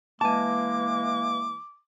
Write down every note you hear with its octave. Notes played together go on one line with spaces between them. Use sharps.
E3 G#3 A#3 G#5 A5 D6